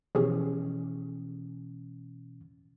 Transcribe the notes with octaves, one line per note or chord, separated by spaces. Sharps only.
B2 E3 F3 C#4 G4 G#4